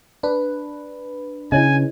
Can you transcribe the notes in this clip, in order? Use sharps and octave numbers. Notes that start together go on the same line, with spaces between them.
D4 B4
C#3 E4 C#5 D#5 G#5